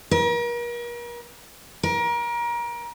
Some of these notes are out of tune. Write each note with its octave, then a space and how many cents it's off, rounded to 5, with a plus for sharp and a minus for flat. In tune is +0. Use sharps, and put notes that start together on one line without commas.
A#4 +40
A#4 +30